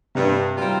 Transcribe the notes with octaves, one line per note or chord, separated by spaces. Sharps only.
G2 C3
D#3 G3 C4 F4